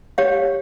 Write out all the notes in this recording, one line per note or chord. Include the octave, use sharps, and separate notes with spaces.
G4 C#5 F5